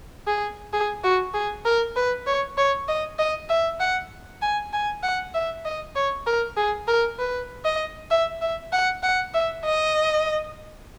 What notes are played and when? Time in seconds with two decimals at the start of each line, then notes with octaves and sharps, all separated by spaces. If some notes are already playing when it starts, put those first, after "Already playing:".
0.27 G#4
0.73 G#4
1.04 F#4
1.34 G#4
1.65 A#4
1.96 B4
2.27 C#5
2.57 C#5
2.88 D#5
3.19 D#5
3.49 E5
3.80 F#5
4.42 G#5
4.73 G#5
5.03 F#5
5.34 E5
5.65 D#5
5.95 C#5
6.27 A#4
6.57 G#4
6.88 A#4
7.19 B4
7.65 D#5
8.11 E5
8.42 E5
8.73 F#5
9.03 F#5
9.34 E5
9.65 D#5